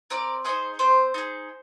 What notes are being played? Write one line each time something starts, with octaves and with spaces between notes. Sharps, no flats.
C4 A#4 D5
D#4 G#4 C5 D#5
C4 C5
D#4 G#4